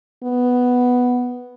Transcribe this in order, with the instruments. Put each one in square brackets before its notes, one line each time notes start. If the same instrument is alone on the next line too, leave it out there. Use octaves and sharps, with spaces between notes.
[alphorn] B3